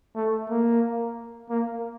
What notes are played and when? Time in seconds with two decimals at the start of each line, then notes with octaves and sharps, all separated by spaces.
0.15 A3
0.50 A#3
1.50 A#3